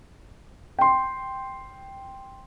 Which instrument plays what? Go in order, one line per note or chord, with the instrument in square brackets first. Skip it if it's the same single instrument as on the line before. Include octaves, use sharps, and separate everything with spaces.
[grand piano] G5 C6